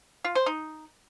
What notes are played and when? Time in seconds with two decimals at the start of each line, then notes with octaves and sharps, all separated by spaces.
0.24 F4
0.35 C5
0.46 D#4